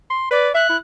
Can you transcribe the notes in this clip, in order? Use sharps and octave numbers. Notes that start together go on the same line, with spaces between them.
C6
B4 D5
E5 F#6
E4